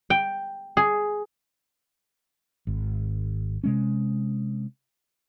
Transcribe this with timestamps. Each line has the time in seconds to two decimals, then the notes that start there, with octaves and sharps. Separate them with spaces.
0.10 G5
0.77 G#4
2.67 G#1
3.64 C3 G#3 C#4